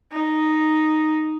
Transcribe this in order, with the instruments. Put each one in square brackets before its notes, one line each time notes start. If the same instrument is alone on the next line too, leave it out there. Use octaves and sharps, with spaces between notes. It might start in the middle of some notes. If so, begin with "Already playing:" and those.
[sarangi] D#4